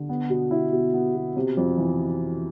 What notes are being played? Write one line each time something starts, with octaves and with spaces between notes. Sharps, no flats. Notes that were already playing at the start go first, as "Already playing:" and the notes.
Already playing: D3
B3
B2
E4
B2
B3
B2
C3
F2
E3